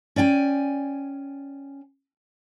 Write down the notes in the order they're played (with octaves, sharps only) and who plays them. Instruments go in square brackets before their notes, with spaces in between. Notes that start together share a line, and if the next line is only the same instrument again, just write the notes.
[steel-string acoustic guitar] C#4 D5 G5 G#5